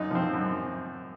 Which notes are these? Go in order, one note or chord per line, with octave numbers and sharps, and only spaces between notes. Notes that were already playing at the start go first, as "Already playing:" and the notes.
Already playing: F#2 D#4
F3 C4
F#2